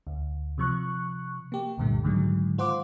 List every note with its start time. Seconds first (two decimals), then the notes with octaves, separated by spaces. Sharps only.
0.07 D2
0.58 C3 F3 C#6 F#6
1.52 A#3 G4
1.78 C2 F#2 A#2 D3 G3 A3
2.04 G#2 D3 D#3 F#3 G#3
2.58 F4 C5 F#5 C6 D6